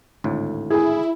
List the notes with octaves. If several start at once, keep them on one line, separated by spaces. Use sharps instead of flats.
G#1 D2 A2
E4 G#4 G#5